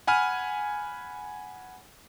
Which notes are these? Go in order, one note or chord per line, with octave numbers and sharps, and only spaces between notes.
F#5 G#5 B5 F6 D#7